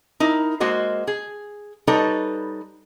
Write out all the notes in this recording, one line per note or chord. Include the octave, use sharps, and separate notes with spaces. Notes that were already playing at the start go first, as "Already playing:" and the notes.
D#4 E4 A#4
G#3 A#3 F#4 C5 D#5
G#4
G3 D#4 A4 B4 C#5 A#5